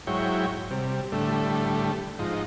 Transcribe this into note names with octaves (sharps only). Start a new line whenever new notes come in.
G#2 F#3 E4 C#5 G5
C3 G3
A2 D3 G3 A3
G#2 F3 D#4